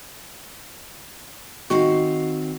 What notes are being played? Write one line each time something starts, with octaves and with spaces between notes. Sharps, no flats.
D#3 C4 F#4 F5